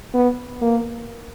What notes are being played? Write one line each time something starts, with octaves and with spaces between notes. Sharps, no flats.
B3
A#3